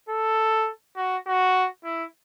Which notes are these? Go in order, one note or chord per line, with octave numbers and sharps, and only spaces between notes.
A4
F#4
F#4
E4